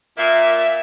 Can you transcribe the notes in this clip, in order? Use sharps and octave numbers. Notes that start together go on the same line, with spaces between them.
A#2 A#3 E5